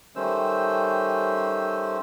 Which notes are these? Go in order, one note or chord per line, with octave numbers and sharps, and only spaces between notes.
D#3 G3 A3 C#4 C5 E6